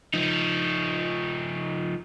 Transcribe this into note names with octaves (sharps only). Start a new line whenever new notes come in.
F3 D#4